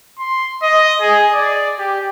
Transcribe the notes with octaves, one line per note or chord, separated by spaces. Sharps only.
C6
D#5
G#4
D5
G4